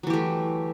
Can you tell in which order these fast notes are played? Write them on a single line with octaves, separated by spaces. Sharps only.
F#3 E3 G4 A3